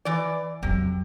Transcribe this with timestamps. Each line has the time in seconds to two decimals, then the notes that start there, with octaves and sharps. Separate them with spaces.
0.05 E3 D5
0.63 F2 C3 F#3